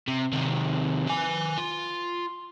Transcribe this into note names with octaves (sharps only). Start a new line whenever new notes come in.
C3
C3 D#3
B4 G#5
F4